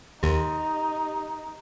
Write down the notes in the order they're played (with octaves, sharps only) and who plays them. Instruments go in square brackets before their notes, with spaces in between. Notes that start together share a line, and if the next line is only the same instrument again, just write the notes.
[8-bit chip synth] D#2 [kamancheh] D#4 [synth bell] G4